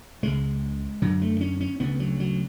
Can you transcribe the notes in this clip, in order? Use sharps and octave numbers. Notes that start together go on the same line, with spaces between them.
C#2 C#3 G#3
F#2 D3 F#3
A3
C#4
C#4
D2 C#3 B3
F#3
F#3